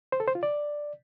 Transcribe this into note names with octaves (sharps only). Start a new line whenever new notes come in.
C5
A4
C5
F4
D5